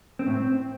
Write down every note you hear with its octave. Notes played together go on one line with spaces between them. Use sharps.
C4
A2
C4